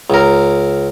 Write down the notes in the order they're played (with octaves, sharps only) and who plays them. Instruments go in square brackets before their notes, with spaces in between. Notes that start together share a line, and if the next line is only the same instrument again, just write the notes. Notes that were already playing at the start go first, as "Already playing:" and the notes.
[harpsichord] C#2 A#4